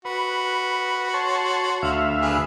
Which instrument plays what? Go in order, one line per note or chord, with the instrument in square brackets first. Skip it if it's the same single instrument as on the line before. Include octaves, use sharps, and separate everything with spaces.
[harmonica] F#4 [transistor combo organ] B4
[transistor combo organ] C#5 A5 C6
D2 E5 F5
[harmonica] D4 G#4 B4